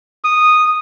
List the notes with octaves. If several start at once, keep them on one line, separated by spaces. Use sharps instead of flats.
D#6